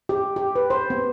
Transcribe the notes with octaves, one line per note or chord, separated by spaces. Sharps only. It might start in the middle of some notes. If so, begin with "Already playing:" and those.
G4
G4
B4
C5
B3